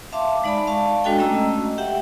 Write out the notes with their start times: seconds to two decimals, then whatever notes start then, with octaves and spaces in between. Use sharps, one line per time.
0.12 E5 F5 A5 C6 D6
0.44 G#3 D#4 D5 A5 B5
0.67 D5 F5 A5 C#6
1.04 G#3 D4 F#4 A4 D#5 G5
1.19 A3 C#4 D#5 A#5 E6
1.78 G4 E5 F#5 G5